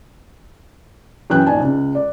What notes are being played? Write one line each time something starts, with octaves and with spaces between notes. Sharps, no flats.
F#2 E3 G5 F#6
A#1 D#4 G#5 A5
C#2
D5